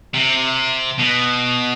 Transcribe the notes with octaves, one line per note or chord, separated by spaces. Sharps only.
C3
B2